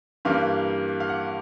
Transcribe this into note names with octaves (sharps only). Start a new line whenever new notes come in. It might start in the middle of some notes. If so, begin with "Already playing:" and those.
G2 E3 G3 A#3 F5
F5
F#5